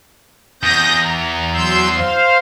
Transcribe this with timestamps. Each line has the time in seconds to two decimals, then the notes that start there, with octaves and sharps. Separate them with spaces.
0.63 E2 D#6 G6 A#6
1.03 A#5
1.54 F#3 C6 E6 G6
1.97 C5 F5